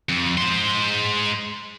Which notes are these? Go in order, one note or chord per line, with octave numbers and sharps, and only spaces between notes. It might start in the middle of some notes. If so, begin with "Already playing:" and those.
F2
G#3 C5